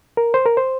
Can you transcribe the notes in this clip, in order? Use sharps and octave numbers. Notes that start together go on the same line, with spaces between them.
A#4
C5
A#4
C5